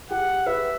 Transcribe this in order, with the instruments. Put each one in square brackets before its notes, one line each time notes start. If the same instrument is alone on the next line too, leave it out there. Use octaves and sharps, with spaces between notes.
[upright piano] G4 [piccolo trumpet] F#5
[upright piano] B4 [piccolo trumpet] E5